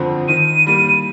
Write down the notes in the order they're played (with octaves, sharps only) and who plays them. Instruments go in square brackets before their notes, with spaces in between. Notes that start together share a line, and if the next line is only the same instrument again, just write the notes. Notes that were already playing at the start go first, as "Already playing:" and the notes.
Already playing: [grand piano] F2 D3 F3 C4
[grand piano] D#3 [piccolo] D#7
[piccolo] D#7
[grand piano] G3 A#3